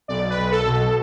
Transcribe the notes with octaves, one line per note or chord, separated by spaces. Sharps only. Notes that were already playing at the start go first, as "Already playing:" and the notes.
B1 D5
B4
B1
A4
B2
A4